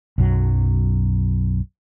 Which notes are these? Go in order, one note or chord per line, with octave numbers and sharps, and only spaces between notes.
B1 F#2 F#3